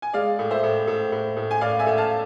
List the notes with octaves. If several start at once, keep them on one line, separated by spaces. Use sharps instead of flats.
G#5
G#3 D5 F5
A2
C5 E5
A2
A2
A2
A2
G#5
A2 D5 F5
E5 G#5
A2
F5 A5